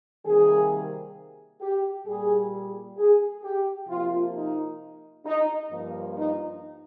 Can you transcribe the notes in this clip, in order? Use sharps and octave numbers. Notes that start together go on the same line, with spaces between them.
C3 D#3 G3 A#3 G#4
G4
A#2 G3 A#3 G#4
G#4
G4
C3 F3 A#3 F4
D#4
D#4
G2 F3 A#3
D#4